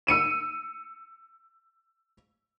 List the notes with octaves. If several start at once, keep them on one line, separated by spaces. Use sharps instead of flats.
E6 C#7 D#7 E7